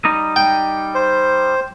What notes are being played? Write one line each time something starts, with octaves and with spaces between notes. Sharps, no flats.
G3 D#4 D#5
G5
C5